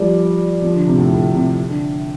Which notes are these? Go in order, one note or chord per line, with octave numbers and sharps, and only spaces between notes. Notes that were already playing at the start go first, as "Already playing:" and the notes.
Already playing: F3 G3
F3
D3
C3
A2
A2
C3
D3